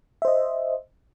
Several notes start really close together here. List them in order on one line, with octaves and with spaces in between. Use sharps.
E5 C5 D#5